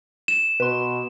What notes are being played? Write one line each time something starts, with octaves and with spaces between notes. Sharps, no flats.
E7
B2 B4 C6